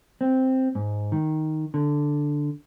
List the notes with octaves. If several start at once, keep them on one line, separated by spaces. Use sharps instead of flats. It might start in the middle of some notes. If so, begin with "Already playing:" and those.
C4
G#2
D#3
D3